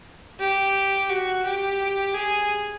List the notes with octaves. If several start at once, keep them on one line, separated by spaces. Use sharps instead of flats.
G4
F#4
G4
G#4